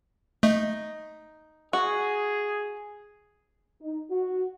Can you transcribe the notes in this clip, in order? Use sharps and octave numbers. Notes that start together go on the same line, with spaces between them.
A3 D#4
F#4 G#4
D#4
F#4